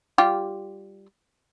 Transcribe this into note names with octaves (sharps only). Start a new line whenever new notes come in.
G3 F4 G4